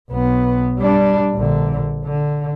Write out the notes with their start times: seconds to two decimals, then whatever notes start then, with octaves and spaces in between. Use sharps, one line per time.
0.11 B1 B3
0.79 G3 D4
1.35 A#1 D3
2.05 D3